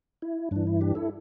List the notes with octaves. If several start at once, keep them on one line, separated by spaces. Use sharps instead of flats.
E4
G2 E3 D4
E4
D4 G4
E4 A4